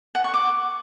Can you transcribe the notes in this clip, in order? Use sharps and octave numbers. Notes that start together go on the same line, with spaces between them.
F#5
C#6
D6